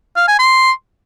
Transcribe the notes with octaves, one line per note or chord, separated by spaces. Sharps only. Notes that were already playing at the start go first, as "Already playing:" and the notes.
F5
G#5
C6